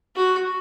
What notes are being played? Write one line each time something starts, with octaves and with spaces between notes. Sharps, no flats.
F#4